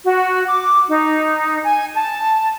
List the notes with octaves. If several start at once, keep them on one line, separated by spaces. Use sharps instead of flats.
F#4
D6
D#4
G#5
A5